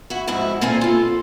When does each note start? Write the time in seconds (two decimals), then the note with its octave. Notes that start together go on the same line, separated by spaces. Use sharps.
0.10 E4 F#4
0.28 F2 G#2 E4 F#4
0.61 A#2 A#3 C4 A4 F5 G#5
0.81 F4 A4